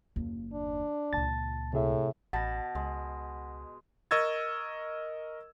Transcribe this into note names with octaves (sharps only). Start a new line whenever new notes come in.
F#1 D#2
D4
C#2 A#2 A5 A6
A2 C3 G#4 E5
A1 B2 F#5 A5 B5 A#6
C#2 G#3
A#4 D#5 C#6 E6 G#6 A6